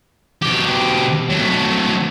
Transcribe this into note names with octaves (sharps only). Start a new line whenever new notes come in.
B2 G4
F#3 A3